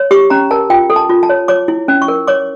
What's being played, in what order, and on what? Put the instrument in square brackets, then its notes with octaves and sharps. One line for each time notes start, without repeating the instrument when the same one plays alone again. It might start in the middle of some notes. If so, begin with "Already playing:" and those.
Already playing: [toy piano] C#5
G4 C#6
C#4 A#5
A#4 A5
F4 G5
A4
A5
F4
A5
C#5
C#5 D6
E4
C#4
C#6
A#4
C#5 D6